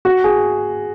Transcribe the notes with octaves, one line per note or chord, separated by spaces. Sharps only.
F#4
G#4